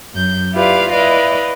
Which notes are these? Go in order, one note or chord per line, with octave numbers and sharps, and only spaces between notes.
F#2 G6
E4 F4 G4 B4 D5 F5
E4 B4 D5 D#5 F5